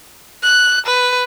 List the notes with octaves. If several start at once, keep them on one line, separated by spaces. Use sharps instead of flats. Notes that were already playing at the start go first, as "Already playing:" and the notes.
F#6
B4